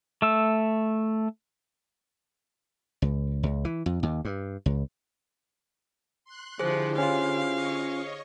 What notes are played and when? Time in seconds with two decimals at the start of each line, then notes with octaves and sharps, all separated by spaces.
0.22 A3 E6
3.02 C#2
3.43 C#2
3.65 E3
3.86 F2
4.03 D#2
4.25 G2
4.66 C#2
6.25 C6 F#6
6.59 D3 F3 E4 G4 G#4 C5 F#6
6.98 C#4 F4 F5
7.54 C#5 D#5 C#6